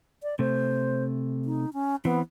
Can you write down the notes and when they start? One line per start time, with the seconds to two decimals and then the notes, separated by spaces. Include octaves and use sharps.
0.23 D5
0.39 C3 A3 C5
1.45 D#4
1.73 C#4
2.05 E3 B3 C4